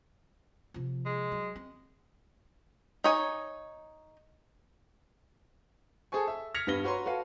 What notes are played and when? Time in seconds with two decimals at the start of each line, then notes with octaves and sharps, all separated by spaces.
0.74 C3 F3
1.05 G#3
1.32 F#3
1.56 C4
3.04 D#4 C#5 G#5
6.12 G#4 A4 C5 G#5 C#6
6.28 E5 E6
6.54 F6 G#6 A#6 B6 C#7 F7
6.67 G2 B3 B4 A#6 G7
6.84 F#4 B4 C#5 A#5 C6
7.06 F#4 A4 B4 F5